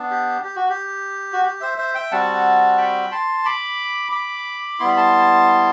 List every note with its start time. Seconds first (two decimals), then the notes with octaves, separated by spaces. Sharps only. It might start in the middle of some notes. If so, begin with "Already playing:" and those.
Already playing: B3 D4
0.11 G4
0.44 G4
0.56 F#4
0.69 G4
1.33 F#4
1.45 G4
1.61 C5 E5
1.78 C5 E5
1.95 E5 G5
2.11 G3 C4 F#4 F#5 A5
2.78 G5 B5
3.11 A5 C6
3.45 B5 D6
4.12 B5 D6
4.80 G3 B3 E4 C6
4.89 B5
4.97 A5 C6